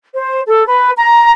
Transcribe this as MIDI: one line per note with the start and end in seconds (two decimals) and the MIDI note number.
0.15 0.40 72
0.47 0.65 69
0.67 0.91 71
0.97 1.32 82